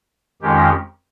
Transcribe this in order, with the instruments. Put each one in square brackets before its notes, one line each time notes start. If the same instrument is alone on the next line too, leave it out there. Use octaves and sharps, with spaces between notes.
[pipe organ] F2 D#3 G#3 C#4 G4